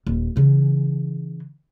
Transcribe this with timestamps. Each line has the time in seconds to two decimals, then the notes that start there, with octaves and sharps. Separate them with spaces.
0.07 D#1
0.36 C#3 E3